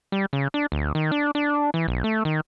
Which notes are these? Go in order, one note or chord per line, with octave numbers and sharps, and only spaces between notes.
G3
C#3
D4
D2
D#3
D4
D4
E3
B1
A3
D#3